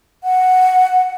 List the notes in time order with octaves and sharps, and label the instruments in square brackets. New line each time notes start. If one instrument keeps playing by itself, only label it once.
[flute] F#5